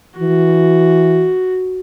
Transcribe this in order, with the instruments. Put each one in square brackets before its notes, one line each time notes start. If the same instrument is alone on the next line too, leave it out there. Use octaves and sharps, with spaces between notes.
[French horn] E3 [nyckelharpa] F#4